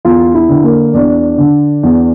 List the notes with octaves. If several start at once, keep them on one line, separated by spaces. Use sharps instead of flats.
E2 F4
E4
D3
A#3
E2 D4
D3
E2